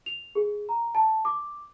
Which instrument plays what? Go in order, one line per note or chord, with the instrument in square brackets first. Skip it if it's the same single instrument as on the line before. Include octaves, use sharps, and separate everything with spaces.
[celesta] F7
G#4
A#5
A5
D6